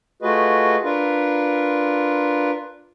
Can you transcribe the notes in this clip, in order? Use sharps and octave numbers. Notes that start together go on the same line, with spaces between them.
A3 F4 F#4 G#4 B4 D#5
D4 F4 A#4 B4